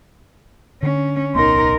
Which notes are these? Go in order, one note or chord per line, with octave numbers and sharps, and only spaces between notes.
D3 C#4
D1 B1 B3 D#4 A#4 C6